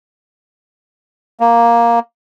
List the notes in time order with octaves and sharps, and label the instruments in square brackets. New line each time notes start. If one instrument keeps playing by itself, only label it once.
[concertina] A#3